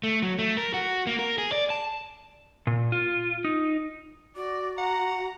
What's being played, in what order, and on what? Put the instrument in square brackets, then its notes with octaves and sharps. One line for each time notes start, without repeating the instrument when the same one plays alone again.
[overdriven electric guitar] A3
F#3
A3
A#4
F#4
A#3
A#4
G#4
D5
A5
[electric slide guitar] A#2
F4
D#4
[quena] F#4 [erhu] D5
[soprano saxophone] F#5 [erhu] A#5